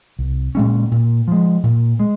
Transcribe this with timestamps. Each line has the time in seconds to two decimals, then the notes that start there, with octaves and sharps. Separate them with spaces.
0.19 C2
0.55 A#2 G#3 C#4
0.91 A#2
1.28 F3 G#3
1.63 A#2
1.99 G#3